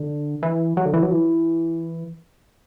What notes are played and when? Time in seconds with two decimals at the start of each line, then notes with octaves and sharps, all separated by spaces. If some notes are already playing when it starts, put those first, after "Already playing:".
Already playing: D3
0.43 E3
0.77 F#3
0.86 D3
0.94 E3
1.03 F#3
1.11 E3